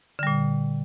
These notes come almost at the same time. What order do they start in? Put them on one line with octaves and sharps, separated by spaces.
D3 G3 A#2